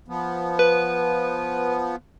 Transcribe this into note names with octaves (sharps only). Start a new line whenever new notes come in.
F3 B3
B4